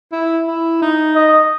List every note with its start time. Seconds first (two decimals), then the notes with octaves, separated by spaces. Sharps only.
0.12 E4
0.47 E4
0.82 D#4
1.16 D#5